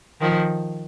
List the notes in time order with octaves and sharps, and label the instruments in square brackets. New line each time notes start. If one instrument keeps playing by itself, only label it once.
[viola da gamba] D#3 F3